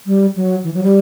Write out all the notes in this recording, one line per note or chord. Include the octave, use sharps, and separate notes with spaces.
G3
F#3
E3
F#3
G3